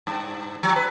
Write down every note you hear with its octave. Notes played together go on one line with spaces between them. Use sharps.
G2
F3
B4